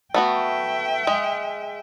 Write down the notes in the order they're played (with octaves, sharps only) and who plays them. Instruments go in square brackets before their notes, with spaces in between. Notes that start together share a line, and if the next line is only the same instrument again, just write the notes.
[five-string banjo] A3 B3 F#4 [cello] E5 G5
[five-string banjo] G#3